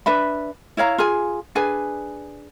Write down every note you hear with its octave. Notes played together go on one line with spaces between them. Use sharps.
D4 B4 E5 B5
E4 C#5 F5 A#5
F4 G#4 G#5
D4 G#4 B4 G#5